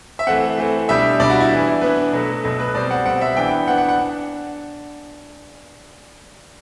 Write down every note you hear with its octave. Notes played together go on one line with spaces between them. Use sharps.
E5
E3 A3 C4 F#5
E3 A3 C4
B2 G3 D4 E5
B2 G3 D4 D5
F#4
E4
E3 B3 D4
E3 B3 D4 B4
B2 F#3 A3
B2 F#3 A3
B4
B2 G3 C4 D5
F#5
B2 G3 C4 F#5
E5
E3 B3 D4 G5
E3 B3 D4 F#5
F#5
F#5
D4